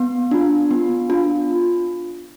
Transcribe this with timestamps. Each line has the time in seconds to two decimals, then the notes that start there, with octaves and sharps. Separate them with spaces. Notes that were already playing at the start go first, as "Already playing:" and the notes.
Already playing: B3
0.31 D4 F4
0.71 B3
1.10 D4 F4